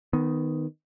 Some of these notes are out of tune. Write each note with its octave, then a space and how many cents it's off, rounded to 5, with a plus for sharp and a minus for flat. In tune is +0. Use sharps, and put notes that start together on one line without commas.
D#3 +0 B3 +20